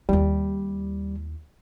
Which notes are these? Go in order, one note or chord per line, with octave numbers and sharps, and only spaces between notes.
D#2 G3 E4